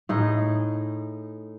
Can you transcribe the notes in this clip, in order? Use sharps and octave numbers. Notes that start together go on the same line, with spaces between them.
A2 D#4 G#4